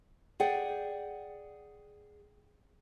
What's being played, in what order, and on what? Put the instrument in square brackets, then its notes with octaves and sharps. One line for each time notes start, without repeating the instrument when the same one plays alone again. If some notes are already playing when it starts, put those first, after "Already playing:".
[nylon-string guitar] G#4 D5 F#5 G5